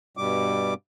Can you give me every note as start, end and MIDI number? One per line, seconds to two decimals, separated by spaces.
0.17 0.74 43
0.17 0.74 47
0.17 0.74 55
0.17 0.74 86